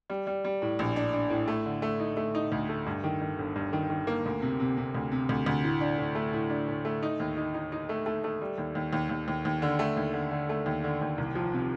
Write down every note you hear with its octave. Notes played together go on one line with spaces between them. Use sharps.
G3
G3
G3
A2
A#1
D4
D4
A2
A3
D3
A3
D#4
A3
D#4
D2
A3
G2
D#3
D#3
G1
G2
D#3
D#3
A#3
D2
C3
C3
C3
D2
C3
D2
D2
A2
D4
A2
A3
A2
D4
A2
A3
D#4
D#2
D#4
D#4
D#4
A3
A3
A3
G3
D#2
D#2
D#2
D#2
D#2
D#2
D3
A3
D#2
D3
D3
A3
D#2
D3
D#2
C2
F3
C3